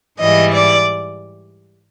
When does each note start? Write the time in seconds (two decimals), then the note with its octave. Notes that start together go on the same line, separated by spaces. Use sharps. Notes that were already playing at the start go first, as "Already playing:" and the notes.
0.19 G#2 E3 G3 D#5
0.53 D5